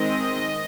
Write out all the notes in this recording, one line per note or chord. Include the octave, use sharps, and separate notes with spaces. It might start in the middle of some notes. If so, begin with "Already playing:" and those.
Already playing: D#3 G#3 C4 D#5